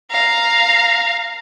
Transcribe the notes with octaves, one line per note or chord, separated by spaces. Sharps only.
F5 A#5